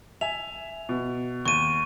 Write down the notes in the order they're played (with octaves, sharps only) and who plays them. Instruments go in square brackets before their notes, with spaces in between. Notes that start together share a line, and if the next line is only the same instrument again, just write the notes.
[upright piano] E5 G#5 [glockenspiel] F7
[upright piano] B2
[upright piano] D#2 [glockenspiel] C#6 D#7